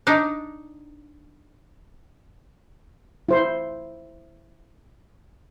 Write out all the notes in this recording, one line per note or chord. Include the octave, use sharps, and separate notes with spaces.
D4 D#4
E4 C5 C6